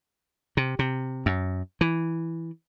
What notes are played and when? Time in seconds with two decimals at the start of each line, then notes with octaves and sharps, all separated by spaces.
0.57 C3
0.79 C3
1.26 F#2
1.81 E3